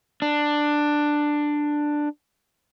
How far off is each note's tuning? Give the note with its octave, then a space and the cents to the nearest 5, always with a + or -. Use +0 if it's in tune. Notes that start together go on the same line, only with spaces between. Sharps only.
D4 +10